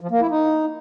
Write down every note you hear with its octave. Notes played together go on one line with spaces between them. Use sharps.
F3
A#3
E4
D#4